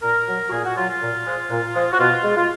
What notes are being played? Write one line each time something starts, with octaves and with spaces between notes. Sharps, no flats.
A#2 A#4
F#3
F#4
A#2 G#4
F#4
F#3 F4
F4
A#2
F3 G#3
A#2
F3 G#3
F#4
B2 F4
G#3
F4